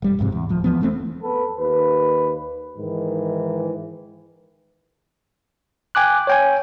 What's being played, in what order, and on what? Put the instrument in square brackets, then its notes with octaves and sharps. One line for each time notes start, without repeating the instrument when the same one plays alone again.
[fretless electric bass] F1 G3
G1 F2 G#2 C3
E2
D1 F3
E2 F3 B3
E1 E3 A3 C4
[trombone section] B3 A4 B4
D#2 B4
G#2 D#3 E3
[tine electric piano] G5 G#5 D6 F#6
C#5 G5 G#5